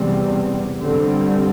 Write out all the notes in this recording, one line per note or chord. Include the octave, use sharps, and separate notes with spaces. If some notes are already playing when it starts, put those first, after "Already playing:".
Already playing: E2 C3 G3 C4
G2 D3 G3 C4